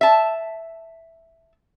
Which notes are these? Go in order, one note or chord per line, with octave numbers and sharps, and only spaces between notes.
E5 A5